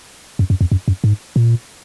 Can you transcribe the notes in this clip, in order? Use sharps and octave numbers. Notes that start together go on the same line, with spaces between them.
F#2
F#2
F2
F#2
F#2
G#2
A#2